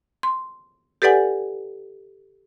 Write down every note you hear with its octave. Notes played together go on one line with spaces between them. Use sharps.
C6
G4 A4 B4 D5 F#5 G#5